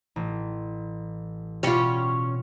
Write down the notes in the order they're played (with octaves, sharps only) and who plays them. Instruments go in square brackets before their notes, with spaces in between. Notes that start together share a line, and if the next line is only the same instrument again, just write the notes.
[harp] A1
[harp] B2 G4 [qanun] G3 F4 [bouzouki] C#4 C#5